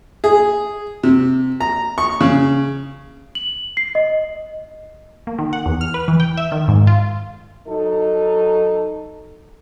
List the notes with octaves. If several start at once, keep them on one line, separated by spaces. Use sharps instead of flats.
G#4
C3
A#5
C#6
C#3
F#7
C7
D#5
A#3
D#3
F#5
E2
F6
B4
E3
G5
E5
D#3
G#2
F4
F#3 D#4 A4